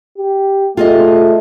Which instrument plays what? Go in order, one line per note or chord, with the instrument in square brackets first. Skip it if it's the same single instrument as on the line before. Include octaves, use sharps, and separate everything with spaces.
[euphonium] G4
[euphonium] A3 [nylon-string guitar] F4 G#4 D#5